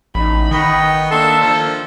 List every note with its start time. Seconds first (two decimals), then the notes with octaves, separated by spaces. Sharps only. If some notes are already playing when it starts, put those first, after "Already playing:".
0.15 A1 D#4 B5
0.51 D#3 B3 D#5 G5 C#6
1.11 A#3 D4 A4 E5 C6 E6
1.41 F3